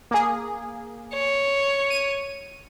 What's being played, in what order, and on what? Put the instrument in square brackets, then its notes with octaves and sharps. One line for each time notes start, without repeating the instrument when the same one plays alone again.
[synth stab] A#3 G#4
[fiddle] C#5
[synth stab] D#7